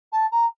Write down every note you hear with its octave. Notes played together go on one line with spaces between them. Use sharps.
A5
A#5